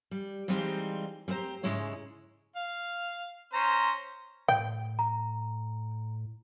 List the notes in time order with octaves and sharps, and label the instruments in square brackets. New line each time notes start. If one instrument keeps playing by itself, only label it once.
[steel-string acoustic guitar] G3
E3 G3 G#3 C4 D#4 F4
G3 C4 G4 C5 A#5
G#2 C#3 G#3 E4 C#5
[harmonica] F5
C#4 C5 A#5
[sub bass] A2 [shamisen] G5
[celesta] A#5